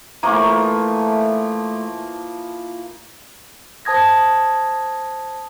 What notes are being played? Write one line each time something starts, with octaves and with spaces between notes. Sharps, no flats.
E3 F3 A3 A#3 A#5 C#6
C5 A5 D#6 G#6 A#6